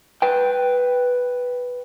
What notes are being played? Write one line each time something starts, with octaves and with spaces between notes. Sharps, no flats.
B4 G5